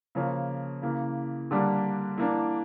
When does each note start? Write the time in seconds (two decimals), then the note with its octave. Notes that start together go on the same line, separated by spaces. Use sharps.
0.15 C#3 F3 A#3 C#4
0.82 C#3 E3 A#3
1.51 D3 G3 A#3 D4
2.18 E3 A#3 D4